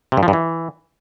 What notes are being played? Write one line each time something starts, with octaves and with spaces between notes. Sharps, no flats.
C3
G2
F3
G2
E3